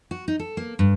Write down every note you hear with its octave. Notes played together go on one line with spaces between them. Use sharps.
F#4
D#4
A4
A#3
G2